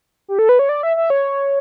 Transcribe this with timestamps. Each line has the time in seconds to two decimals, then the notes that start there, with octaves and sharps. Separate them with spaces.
0.28 G4
0.39 A4
0.49 B4
0.59 C#5
0.69 D5
0.83 E5
0.97 E5
1.10 C#5